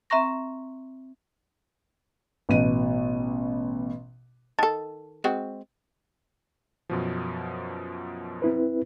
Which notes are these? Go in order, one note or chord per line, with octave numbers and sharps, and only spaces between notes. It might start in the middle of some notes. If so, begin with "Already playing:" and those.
C4 E5 A#5 C#6 A#6
A1 B2 D#7
D#3 A4 A5
G#3 C4 F#4
F#2 B2 F3
C4 E4 B4